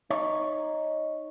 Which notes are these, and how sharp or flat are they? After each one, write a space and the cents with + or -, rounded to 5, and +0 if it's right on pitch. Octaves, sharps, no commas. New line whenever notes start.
D#4 +0 C#5 +0